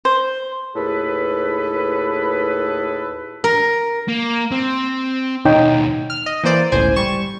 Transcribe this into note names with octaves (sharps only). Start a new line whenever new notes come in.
C5
D#2 A2 G#4 A4 B4
A#4
A#3
C4
D#2 B2 D#4 C#5 G5
F6
D#5
E3 A#3 C5 D5
G1 C#2 A2 C5 G#5
G3 C#6 E7